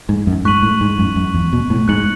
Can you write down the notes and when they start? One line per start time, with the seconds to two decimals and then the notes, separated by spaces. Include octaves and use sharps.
0.09 G#2
0.27 F#2
0.45 G#2 C#6 F#6 B6 D#7 F#7
0.62 A2
0.81 G#2
0.99 F#2
1.16 F#2
1.34 E2
1.53 B2
1.70 A2
1.88 G#2 F#6 C#7 F#7